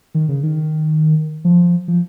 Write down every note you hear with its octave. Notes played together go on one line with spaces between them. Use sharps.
D#3
C#3
D#3
F3
F3